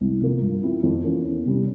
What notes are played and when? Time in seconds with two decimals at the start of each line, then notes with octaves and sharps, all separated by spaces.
0.01 C2
0.21 C3 F3 A#3
0.42 G2
0.63 F3 C4 E4
0.83 F2
1.04 E3 A#3 C#4
1.25 E2
1.46 C3 G3 C#4